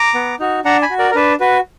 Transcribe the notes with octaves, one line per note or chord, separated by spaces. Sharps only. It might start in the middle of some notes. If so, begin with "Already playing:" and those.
Already playing: A#5 D6
B3
D#4 F#4
D4 F#5 A#5
G#5 B5
F#4
A#4 D5
A#4
D4 B4
F#4 B4